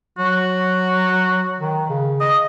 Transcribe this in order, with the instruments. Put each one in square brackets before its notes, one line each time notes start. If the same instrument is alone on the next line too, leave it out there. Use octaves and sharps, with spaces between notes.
[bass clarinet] F#3 [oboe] F#4
[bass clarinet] D#3
C#3
[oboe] D#5